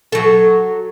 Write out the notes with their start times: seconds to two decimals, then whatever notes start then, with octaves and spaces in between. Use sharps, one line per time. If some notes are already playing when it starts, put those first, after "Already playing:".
0.12 F#3 A4